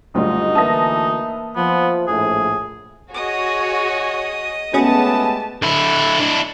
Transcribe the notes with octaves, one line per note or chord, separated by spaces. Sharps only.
F#1 D2 G3 D#4 F4 D#5
D2 E3 A#3 B4 E5 A5 D#6 A#6
F3 B3
A#1 A2 G#4
F#4 G#4 C#5 D#5 D#6
B2 G#3 A3 B3 C#4 G4 G#4 A5
D3 E4
D4 E4